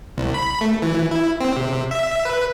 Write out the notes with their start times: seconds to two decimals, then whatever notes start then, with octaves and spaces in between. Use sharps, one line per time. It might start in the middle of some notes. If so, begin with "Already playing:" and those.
0.18 C2
0.34 B5
0.61 A3
0.82 E3
1.11 E4
1.40 C4
1.57 C3
1.91 E5
2.25 B4